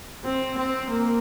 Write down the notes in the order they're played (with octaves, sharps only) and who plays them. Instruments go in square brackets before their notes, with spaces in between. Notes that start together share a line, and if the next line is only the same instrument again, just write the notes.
[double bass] C4
C4
A#3